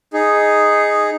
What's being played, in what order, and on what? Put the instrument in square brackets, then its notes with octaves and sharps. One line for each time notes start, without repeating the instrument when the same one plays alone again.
[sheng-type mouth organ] D#4 G#4